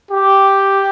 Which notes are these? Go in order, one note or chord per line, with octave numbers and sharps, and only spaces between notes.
G4